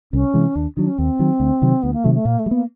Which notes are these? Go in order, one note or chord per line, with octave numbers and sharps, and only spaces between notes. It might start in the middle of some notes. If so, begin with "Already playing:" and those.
C2 C#4
C3 E3 G#3
D#2 D4
D#3 F#3 D4
C#4
D#2 C4
D#3 F#3
D2
C3 D#3 F#3
D2 B3
A#3
C3 D#3 F#3 A3
A3
A#2 A#3
A3
G3
A#3 B3